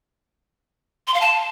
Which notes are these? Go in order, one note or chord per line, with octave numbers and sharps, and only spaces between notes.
C6
F5
A5